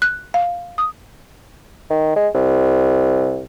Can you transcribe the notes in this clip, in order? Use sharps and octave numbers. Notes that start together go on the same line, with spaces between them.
F#6
F5
D#6
D#3
G#3
C2